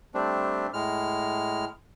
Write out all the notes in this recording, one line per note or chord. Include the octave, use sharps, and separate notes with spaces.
G3 A3 C4 D4
A2 G#3 F6